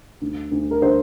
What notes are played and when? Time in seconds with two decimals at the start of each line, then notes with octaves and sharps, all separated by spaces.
0.22 D2
0.52 D2
0.71 A#4
0.82 D3 C5